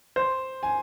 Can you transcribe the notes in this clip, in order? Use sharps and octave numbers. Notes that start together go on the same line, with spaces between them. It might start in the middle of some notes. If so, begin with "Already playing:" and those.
C5
G#5